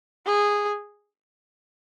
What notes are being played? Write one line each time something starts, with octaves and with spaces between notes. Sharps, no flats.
G#4